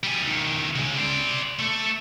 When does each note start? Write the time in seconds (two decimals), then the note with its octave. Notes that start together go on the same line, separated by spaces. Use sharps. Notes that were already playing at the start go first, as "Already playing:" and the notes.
0.04 G3 G#4
0.22 C#2 D#3
0.75 C#3 G#3
0.98 C5 D5
1.59 A3 A4